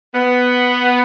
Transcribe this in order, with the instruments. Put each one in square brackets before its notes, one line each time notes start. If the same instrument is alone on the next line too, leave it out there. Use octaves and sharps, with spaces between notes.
[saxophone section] B3